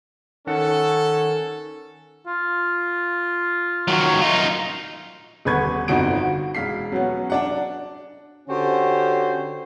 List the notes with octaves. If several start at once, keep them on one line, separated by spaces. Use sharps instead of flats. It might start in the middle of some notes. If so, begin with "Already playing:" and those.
D#3 C#4 A4 F#5
F4
D#3 F#3
D#4 F4
D#1 D3 B3 B4 C#6 G#6
G1 F2 D3 D#4 F#4 D7
F#4
E1 F5 B6 C7
F#3 B3 C#4
D4 D5 F#5
D3 C#4 F#4 G4 C5